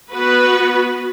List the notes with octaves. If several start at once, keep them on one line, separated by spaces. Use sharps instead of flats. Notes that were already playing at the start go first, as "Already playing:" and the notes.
B3 F#4 B4